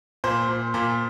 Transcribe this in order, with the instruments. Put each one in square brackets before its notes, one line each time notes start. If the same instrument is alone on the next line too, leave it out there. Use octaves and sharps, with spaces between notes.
[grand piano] A#2 C5
A#2
A#2